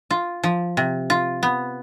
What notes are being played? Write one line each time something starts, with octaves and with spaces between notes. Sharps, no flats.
F4
F3
C3
F4
B3